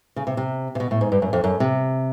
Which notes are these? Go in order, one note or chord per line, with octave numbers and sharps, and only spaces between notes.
C#3
C3
C3
C3
B2
A2
G#2
G2
F#2
F2
F#2
C3